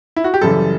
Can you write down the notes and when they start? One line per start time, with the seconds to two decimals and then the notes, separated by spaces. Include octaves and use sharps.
0.16 E4
0.24 F#4
0.34 G4
0.42 F#2 C#3 E3 G3 A4